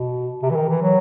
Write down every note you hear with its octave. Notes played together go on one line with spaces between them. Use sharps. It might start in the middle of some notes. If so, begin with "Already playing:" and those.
Already playing: B2
C3
E3
D#3
E3
F#3